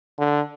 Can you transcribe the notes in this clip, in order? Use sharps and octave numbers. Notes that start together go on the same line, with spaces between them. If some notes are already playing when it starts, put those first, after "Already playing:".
D3